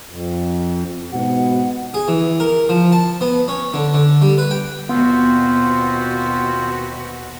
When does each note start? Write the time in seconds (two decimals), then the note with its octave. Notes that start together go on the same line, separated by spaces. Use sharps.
0.08 F2
1.12 G#2 B2 F#5
1.94 G#4
2.08 E3
2.40 A#4
2.69 F3
2.93 A5
3.21 B3
3.48 C#4
3.74 D3
3.94 D3
4.22 G3
4.38 B4
4.51 G5
4.89 D#2 B2 B3 C4 F4 F#4 C5